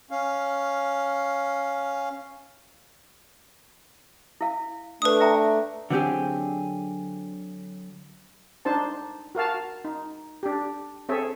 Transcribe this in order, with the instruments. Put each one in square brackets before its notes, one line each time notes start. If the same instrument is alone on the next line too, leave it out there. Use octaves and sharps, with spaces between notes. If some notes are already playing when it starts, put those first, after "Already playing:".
[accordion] C#4 F5
[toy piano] E4 F5
[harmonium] A3 D4 [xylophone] B4 D#6
[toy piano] E5 G5 A#5
[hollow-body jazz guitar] D3 F#3 B3 C4 G4 G#4
[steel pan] D4 D#4 C5 A5
F#4 A#4 F5 A5
D#4
D4 G4
C4 G#4 A4 C#5 E5